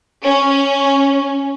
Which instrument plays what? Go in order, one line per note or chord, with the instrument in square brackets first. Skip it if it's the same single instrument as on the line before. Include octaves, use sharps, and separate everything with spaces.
[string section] C#4